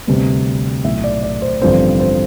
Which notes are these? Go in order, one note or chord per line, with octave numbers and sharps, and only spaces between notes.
D2 C3 G3 B3
B1 A2 E3 E5
D5
D5
C5
A1 G2 D3 F3 C4 C5
C5